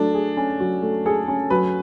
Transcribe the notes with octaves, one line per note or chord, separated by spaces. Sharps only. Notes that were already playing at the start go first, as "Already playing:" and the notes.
Already playing: F#3 A3 D4
G#4
C#4
F#3
A3
G#4 A4
C#4
F#3 B4